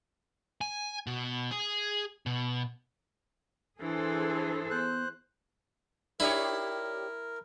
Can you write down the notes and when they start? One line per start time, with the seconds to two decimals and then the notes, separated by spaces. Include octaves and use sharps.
0.61 G#5
1.07 B2
1.51 G#4
2.26 B2
3.81 E3 D4 G#4 A4 C5
4.71 B3 C5 F#6
6.20 D4 E4 G4 A#4 C#5